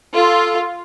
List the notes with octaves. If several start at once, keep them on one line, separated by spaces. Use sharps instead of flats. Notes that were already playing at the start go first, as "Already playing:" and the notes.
F4 A4